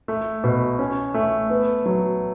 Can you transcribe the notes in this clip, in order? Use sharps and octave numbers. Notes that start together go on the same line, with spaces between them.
A3
B2
C#4
A3
B3
F#3